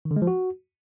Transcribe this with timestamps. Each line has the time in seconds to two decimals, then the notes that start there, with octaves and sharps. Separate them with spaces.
0.05 D#3
0.11 D3
0.16 G#3
0.22 F3
0.27 F#4